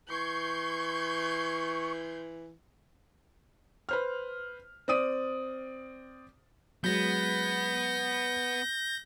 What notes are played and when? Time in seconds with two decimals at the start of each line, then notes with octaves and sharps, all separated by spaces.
0.10 E3 C6 C#6 G6 G#6
3.89 B4 C5 F6
4.88 C4 D5 D#6 D#7
6.84 F#3 G#3 B3 G6 A#6